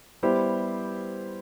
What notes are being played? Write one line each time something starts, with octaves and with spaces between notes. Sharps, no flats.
G3 B3 E4 G4 C5